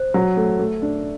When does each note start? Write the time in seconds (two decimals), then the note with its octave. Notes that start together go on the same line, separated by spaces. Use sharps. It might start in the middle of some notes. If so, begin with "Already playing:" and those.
Already playing: C5
0.14 F#3
0.37 A3
0.59 A3
0.82 D4